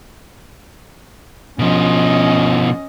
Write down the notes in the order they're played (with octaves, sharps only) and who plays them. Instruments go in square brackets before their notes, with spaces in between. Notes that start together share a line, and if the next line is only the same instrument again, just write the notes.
[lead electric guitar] B2 F3 [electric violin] C#4 D#5